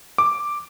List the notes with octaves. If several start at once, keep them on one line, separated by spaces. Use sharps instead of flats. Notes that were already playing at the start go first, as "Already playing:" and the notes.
D6